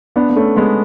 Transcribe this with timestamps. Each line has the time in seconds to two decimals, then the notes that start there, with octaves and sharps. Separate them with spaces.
0.16 B3 D4
0.30 B3
0.36 A3 C#4
0.56 G#3 B3